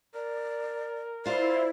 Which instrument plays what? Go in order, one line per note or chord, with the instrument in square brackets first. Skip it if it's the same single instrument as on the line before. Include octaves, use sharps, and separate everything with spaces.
[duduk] A#4 [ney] D5
[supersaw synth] E4 [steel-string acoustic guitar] F4 C5 [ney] D5